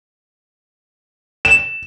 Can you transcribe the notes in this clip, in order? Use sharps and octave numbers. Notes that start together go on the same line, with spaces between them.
E7